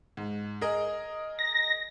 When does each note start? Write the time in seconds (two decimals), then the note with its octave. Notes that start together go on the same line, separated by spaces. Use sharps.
0.17 G#2
0.61 G#4 A#4 D#5
1.39 A#6